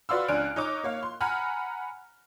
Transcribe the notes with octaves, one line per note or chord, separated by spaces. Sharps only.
F#4 B4 D5 F5 C6 E6
C#2 D4 G#5 F6 F#6 D7
D#4 C#5 D#5 D6
A#3 C#5 F5
C6
F#5 G#5 A#5 B5 F6